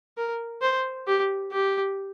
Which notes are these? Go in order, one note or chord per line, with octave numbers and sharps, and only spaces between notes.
A#4
C5
G4
G4